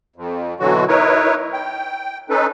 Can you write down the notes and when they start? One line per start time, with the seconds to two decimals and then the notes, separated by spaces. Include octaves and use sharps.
0.16 F2
0.60 B2 D3 E3 F#3 F#4
0.88 D#4 E4 A#4 B4 C#5
1.53 G5
2.30 C#4 D#4 A4 B4